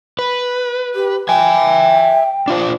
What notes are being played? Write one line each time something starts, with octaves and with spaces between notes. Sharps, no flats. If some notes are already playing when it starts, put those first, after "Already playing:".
B4
G4
E5 G5 G#5
D4 F4 C5